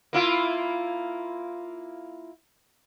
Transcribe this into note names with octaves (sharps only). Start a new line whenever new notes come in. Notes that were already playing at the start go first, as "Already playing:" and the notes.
A#3 E4 F4